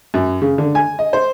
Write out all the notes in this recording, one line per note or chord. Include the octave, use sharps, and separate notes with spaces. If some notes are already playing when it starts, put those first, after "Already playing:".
F#2
C#3
D3
G#5
D#5
C5